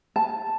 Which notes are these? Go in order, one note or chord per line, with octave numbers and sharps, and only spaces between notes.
A5